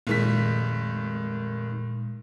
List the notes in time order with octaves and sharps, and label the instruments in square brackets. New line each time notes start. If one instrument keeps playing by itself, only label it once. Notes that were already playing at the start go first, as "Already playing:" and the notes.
[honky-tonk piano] F1 D#3 B6 [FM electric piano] A#2 G#3